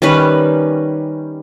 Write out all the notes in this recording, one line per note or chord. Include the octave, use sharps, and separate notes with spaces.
D#3 G3 C#4 B4